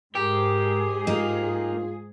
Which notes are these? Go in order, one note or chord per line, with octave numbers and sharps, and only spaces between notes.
G#2 G4 G#4 A#4
A#3 D#4 F4